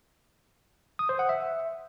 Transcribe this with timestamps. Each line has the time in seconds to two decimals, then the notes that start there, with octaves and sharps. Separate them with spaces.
0.99 D#6
1.09 C5
1.19 F#5
1.29 E5